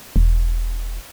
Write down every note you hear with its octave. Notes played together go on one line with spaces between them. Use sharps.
E1